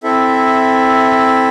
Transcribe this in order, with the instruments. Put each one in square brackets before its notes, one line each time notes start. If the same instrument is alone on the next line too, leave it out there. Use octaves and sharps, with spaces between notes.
[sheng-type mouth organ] C4 E4 A4 E5